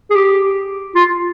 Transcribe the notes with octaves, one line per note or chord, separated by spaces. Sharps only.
G#4
G4
F4